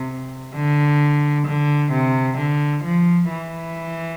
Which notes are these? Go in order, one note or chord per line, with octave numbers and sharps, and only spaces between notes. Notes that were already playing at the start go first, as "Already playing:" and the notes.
Already playing: C3
D3
D3
C3
D3
F3
E3